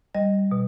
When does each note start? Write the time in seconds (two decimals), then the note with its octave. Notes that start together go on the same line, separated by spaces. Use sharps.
0.15 G3 D#5
0.52 B2